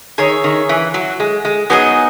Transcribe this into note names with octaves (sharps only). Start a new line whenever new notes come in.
D#3 G#4 C#5 E5
D#3
E3
F#3
G#3
G#3
F#3 B3 D#4 G#4 D#5